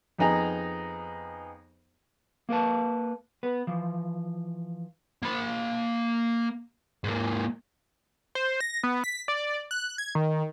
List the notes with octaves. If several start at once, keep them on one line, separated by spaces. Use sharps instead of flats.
F2 B3 D#4 G#4 A#5
A#3 A#4 B4 A5
B3 B4
E3 F3
A#3 B5
G#2 A#3
C5
A#6
B3
B6
D5
F#6
G#6
D#3